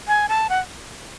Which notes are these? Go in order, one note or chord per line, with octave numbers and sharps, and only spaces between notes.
G#5
A5
F#5